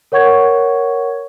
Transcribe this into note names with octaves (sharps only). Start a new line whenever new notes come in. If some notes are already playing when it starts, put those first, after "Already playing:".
A#4 C#5 F#5 C#6 G#6